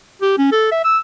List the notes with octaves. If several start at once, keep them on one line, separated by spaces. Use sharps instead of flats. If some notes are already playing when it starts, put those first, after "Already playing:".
G4
C#4
A4
E5
E6